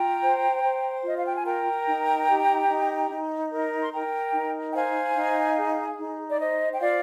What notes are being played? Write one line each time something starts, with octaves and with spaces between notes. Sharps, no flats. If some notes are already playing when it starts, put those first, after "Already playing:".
Already playing: F4 G5 A#5
C5
C5
F4 D#5
F5
G5
G#5
A#4 G5 A#5
D#4
G4
D#4
D#4
A#4
C6
A#4 G5 A#5
D#4
G5
C5 F5 G#5
D#4
G#4
D#4
D5
C5 D#5
G5
F4 D5 F5